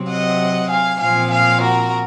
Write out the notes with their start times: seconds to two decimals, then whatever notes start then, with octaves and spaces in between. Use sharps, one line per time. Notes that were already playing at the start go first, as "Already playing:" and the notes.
Already playing: C3 F#3 C4
0.09 D#5 F#5
0.70 F5 G#5
1.00 A#2 F3 C4 F5 G#5
1.31 F5 G#5
1.61 F#4 A#4